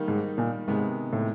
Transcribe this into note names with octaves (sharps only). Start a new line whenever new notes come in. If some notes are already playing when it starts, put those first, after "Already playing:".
Already playing: D#3 G3 A#3 D#4
G#2
A#2
G#2 C3 D#3 G#3 B3
A2